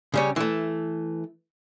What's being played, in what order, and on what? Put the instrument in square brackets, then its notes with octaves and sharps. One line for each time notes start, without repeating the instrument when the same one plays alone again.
[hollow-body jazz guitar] C#3 G3 C#4
E3 A3